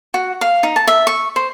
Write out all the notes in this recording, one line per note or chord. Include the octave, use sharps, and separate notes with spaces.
F#4
F5
D#4
A5
E5
C#6
C5